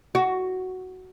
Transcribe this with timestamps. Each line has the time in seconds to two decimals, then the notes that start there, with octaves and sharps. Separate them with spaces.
0.15 F#4